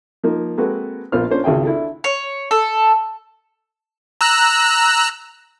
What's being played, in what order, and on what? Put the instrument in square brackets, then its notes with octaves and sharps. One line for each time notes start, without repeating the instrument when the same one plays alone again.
[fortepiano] F3 A#3 D#4
G#3 A#3 C4 F#4 A4 B4
A#1 A#3 B3 F4 C5 F6
A#3 C#4 D4 F4 C5
G#1 C#2 G#4 E5 G5
D4 E4 A4
[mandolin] C#5
A4
[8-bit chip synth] A#5 E6 F#6